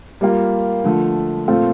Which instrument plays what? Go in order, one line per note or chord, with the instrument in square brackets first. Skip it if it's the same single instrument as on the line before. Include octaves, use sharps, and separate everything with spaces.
[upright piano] G3 A#3 F4
D3 F3 A3
A#2 A3 C4 F4 A4